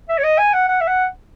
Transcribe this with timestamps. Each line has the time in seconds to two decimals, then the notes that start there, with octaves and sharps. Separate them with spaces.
0.09 E5
0.18 C#5
0.24 D#5
0.38 G#5
0.53 F#5
0.69 F#5
0.80 E5
0.87 F#5